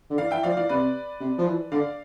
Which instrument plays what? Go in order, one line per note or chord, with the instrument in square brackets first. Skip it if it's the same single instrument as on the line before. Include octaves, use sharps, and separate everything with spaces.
[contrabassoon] D3
[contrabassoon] E3 [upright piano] D5 F5
[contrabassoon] E3 [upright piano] E5 G5
[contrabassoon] F3 [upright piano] D5 F5
[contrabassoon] E3 [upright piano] D5 F5
[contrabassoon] C3 [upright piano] B4 D5
[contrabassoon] C3
F3
E3
[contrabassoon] D3 [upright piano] D5 F5